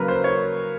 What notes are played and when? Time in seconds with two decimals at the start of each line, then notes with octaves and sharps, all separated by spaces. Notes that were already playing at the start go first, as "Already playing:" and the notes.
Already playing: C#3 F#3 A#3 A#4 B4
0.08 C5
0.24 C#5